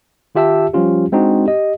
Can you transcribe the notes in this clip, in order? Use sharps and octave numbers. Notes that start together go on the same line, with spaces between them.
D#3 F4 G4 E5 A5 E6
F3 G3 C#4 F4 G4
G#3 C4 D4 D#4 F#4
G4 D#5